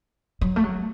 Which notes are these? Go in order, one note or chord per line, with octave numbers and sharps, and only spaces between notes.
F#3
A3
F#3